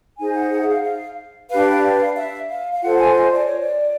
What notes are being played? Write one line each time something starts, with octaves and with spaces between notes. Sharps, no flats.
D#4 G#4 C5 G#5
F#5
F#5
E5
F5
F5
D4 G4 B4 F5
F5
F5
E5
F5
F5
F4 A4 C5 F#5
G#5
D#5
D5
C#5
D5